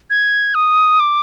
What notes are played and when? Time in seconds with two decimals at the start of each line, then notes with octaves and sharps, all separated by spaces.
0.10 G#6
0.55 D#6
1.00 D6